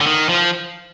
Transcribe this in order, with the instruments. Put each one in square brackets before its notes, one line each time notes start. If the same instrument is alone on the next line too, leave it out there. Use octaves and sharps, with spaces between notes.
[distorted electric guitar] D3
D#3
F3